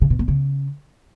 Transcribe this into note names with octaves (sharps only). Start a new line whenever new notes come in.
C#3
B2
A#2
C#3